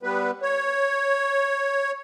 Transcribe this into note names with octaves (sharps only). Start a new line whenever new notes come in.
G3 B3 B4
C#5